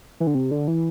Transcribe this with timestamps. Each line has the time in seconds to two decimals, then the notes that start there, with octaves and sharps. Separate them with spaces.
0.20 E3
0.27 D3
0.35 C3
0.51 D3
0.68 E3